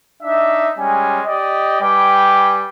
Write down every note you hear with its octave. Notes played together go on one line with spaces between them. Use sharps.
D4 D#4 E5
G3 G#3 C#4 G#5
G4 D5 D#5
G3 B4 G5 G#5 D6